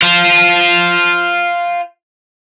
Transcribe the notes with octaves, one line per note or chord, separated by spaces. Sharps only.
F4 C5